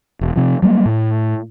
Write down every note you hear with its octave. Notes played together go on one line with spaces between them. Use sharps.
E1
C3 F3
F#3 G3 A#3
A2